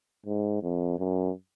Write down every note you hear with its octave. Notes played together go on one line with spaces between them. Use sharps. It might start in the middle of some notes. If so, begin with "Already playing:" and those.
G#2
F2
F#2